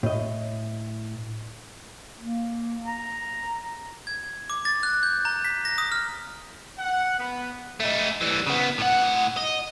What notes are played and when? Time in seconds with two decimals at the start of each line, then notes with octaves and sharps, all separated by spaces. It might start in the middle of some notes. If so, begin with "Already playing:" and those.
0.03 A2 D#5
2.19 A#3
2.85 A#5
4.07 G#6
4.50 D6
4.65 A6
4.83 F#6
5.03 G6
5.25 A#5
5.45 B6
5.65 A#6
5.78 D#6
5.92 F6
6.79 F#5
7.19 B3
7.80 A3 D#4
8.21 E3 G3
8.46 C#3 B3
8.78 A2 F#5
9.37 D#5